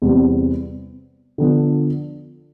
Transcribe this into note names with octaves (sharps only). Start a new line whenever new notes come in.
E2 C3 G3 C4
D3 F3 B3 D4